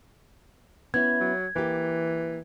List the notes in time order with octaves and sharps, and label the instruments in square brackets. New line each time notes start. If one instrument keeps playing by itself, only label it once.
[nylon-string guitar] B3 C#4 E4 [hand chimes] G#6
[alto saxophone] F#3
[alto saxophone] E3 [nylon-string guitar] A#3 G4